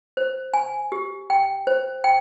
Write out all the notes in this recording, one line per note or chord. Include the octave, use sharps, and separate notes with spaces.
C5
G#5
G4
G5
C5
G5